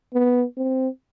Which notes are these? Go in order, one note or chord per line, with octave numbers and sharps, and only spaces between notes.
B3
C4